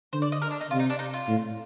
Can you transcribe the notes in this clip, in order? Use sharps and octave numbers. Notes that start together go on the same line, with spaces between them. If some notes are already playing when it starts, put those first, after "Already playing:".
D3 C5
D5
D#5
A#4
D4
D#4
C3 F4
D#4
D4
D#4
F4
A2